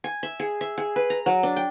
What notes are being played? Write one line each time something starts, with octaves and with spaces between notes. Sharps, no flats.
G#5
E5
G#4
E5
G#4
B4
A#5
F#3
D4
G5